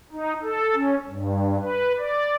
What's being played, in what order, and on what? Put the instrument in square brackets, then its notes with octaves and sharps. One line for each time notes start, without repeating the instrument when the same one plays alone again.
[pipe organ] D#4
A4
C#4
G2
B4
D5